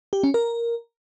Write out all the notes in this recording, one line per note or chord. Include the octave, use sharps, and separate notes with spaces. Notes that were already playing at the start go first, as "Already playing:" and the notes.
G4
C#4
A#4